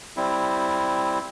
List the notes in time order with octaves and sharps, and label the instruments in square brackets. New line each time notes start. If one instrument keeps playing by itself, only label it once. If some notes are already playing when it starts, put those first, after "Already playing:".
[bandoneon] G3 C4 E4